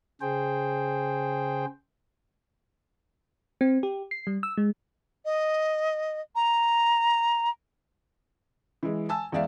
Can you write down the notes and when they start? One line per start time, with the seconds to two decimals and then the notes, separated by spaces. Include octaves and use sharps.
0.21 C#3 G#4 C5 G5
3.61 C4
3.83 G4
4.11 C7
4.27 G3
4.43 E6
4.57 G#3
5.25 D#5
6.35 A#5
8.83 E3 G#3
9.09 G#5 A5 E6
9.32 E2 G#3 D5 E5 F5